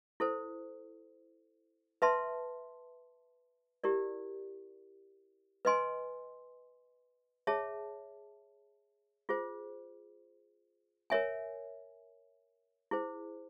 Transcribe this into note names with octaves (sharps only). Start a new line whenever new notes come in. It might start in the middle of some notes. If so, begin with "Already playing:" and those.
E4 A4 C5
B4 E5 A5 C6
E4 G4 A#4 D5
B4 D#5 G#5 C6
G#4 C#5 E5 A5
F4 G#4 C5
A#4 C#5 E5 G#5
E4 G#4 C5